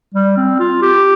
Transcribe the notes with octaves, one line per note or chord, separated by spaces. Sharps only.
G3
C4
F4
G4